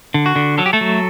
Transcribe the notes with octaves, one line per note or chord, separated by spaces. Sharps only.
D3
F#4
D3
F#3 A4
G4
A3 A4
F#3